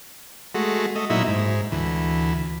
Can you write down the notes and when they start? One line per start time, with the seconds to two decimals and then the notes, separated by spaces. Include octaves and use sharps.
0.55 G#3 A3 F#4
0.95 A3 D#5
1.10 A#2 F#3 D#4 E4 E5
1.28 G#2
1.72 D2 E3